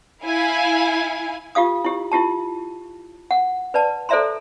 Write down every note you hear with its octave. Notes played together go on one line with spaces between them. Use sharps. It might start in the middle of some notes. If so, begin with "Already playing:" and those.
E4 F5 G#5
F4 G4 F5 D#6
E4 G4
E4 F4 G4 A5
F#5
B4 D5 A5
A4 C5 D5 E5 A#5 C6